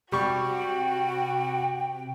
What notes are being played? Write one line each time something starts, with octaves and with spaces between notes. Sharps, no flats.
C3 G3 F#4 G5 C#6